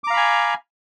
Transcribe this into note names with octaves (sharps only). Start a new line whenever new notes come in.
F5 G#5 A#5 B5 D6